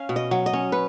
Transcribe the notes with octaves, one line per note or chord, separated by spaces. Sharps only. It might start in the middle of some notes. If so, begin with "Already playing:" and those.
Already playing: C#4 F5
B2
D#5
F#3
D#5
C#4
B4